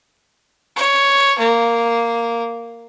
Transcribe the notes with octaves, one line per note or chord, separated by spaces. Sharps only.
C#5
A#3